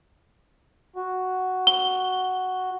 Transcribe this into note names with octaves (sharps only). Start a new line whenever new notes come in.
F#4
G7